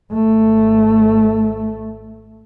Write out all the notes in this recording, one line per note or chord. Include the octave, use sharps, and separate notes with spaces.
G#1 A3